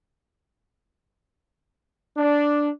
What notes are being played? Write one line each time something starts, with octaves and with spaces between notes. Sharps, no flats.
D4